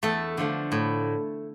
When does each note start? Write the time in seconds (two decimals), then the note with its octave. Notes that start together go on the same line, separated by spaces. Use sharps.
0.03 E2 A3 A4
0.37 D3 F3 A3
0.72 A2